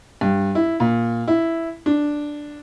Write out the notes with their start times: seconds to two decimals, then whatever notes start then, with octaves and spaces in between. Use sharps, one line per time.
0.21 G2
0.55 E4
0.80 A#2
1.28 E4
1.86 D4